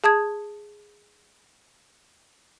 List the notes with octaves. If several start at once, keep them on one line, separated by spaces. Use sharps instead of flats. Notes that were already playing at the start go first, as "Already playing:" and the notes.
G#4 A5 D#6 G#6